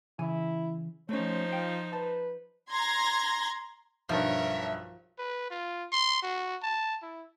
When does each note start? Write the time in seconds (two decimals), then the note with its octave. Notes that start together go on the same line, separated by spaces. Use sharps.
0.19 C#3 E3 E4 G#5
1.09 F3 A3 C#4 D#4 C5 C#5
1.53 F4 G5
1.93 B4 A5
2.71 A#5 C6 G#6 A#6
4.09 B1 G2 F3 A#4 C#5 E5
5.19 B4
5.50 F4
5.92 C6
6.22 F#4
6.62 A5
7.02 E4